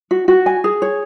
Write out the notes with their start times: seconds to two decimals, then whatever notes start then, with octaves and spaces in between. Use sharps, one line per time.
0.11 F#4
0.28 F#4
0.46 G#5
0.64 G#4
0.82 C#5